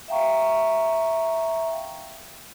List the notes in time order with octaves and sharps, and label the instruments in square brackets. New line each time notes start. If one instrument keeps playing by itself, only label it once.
[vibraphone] E5 F5 G5 A#5 C#6